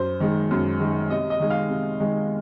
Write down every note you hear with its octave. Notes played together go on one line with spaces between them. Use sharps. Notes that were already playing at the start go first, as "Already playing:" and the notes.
Already playing: F#2 C5
D#3 G#3
F#2
D#3 G#3
C3 D#5
D#5
D#3 G#3
F5
C3
D#3 G#3